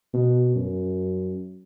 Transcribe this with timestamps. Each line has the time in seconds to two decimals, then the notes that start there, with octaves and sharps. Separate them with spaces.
0.13 B2
0.56 F#2